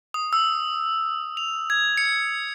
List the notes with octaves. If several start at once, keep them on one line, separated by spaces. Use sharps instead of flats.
D#6
E6
F7
G#6
C#7